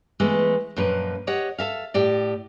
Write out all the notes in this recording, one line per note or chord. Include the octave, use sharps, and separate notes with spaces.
E3 G#3 A3 B3
F#2 A#2 F3 B4
G4 C#5 D#5 F#5
A4 E5 F5
A2 G4 D5